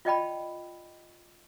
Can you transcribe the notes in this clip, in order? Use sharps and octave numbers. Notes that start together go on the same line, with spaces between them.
F4 D5 D#5 G5 A5 B5